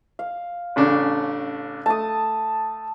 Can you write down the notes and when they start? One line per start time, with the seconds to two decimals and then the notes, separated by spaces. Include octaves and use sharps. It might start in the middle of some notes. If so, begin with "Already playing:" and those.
0.19 F5
0.76 A1 C#3 D4
1.86 A3 A5 D#6